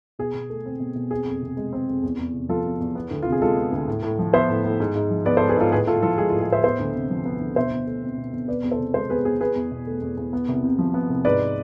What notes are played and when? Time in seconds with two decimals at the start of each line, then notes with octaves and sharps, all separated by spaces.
0.19 B2 G#4
0.34 B2
0.50 A3
0.66 C4
0.80 B2
0.95 B2
1.11 C4 G#4
1.26 F2
1.42 C3
1.57 G#3
1.73 C4
1.89 F2
2.03 E2
2.19 E2
2.34 C3
2.49 F3 F4 A4
2.65 E2
2.80 E2
2.95 B3
3.11 D2
3.22 C3 F4
3.32 G#4
3.41 G#3 F4 A4
3.56 B3
3.72 D2
3.88 A2
4.03 A2
4.19 F3
4.33 B3 C5 E5
4.49 A2
4.64 A2
4.80 G#2
4.95 G#2
5.11 F3
5.25 B3 B4 D5
5.37 A4 C5
5.41 G#2
5.49 G#4 B4
5.57 G#2 F4 A4
5.71 A2 G#4 B4
5.87 A2 F4 A4
6.02 F3 F4 A4
6.18 G#3 G#4
6.30 F4
6.33 A2
6.41 G#4
6.49 A2 C5 E5
6.64 B3 C5 E5
6.80 D2
6.95 C3
7.10 F3
7.25 B3
7.41 D2
7.56 B2 C5 E5
7.72 B2
7.87 A3
8.02 C4
8.18 B2
8.33 B2
8.48 B3 B4 D5
8.63 E2
8.71 A4 C5
8.79 C3
8.94 G#3 A4 C5
9.10 B3 G#4 B4
9.25 E2 G#4
9.41 E2 G#4 B4
9.56 E2
9.71 B2
9.87 A3
10.02 E2
10.17 E2
10.33 B3
10.48 C2
10.64 C3
10.79 F3
10.94 B3
11.10 C2
11.25 G#2 B4 D5